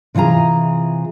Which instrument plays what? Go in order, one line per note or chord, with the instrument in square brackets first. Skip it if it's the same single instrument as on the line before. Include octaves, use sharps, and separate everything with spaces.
[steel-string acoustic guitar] C3 E3 F4 G#4 A#5